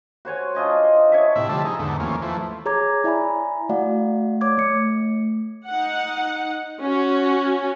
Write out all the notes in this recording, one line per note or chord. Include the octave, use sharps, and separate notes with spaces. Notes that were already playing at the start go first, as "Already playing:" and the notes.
F#4 C5 C#5 G#5
D4 F4 D#5 G#5
C#5 D#5 E5
A2 C3 E4 E5
D3 F3 G3 E5 A5
D#4 G#4
E2 G#2 D3 A3
D#2 F3 A#3 C#4
E3 F3 A3
G#4 C#5 A#5 D6 G#6
E4 D5 E5 G#5 A#5 B5
A3 F#4 D5 F5 F#5
C#5 D6 G#6
A3 C#7
D#4 F#5
C#4 F#4